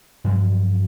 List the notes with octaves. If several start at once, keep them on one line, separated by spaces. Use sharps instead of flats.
G2 F3 F#3